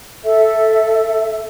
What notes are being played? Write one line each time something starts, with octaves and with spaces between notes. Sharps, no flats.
A4 E5